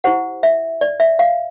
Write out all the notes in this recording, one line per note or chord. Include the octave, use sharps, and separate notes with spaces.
E4 G4 C5 F#5
E5
D5
E5
F5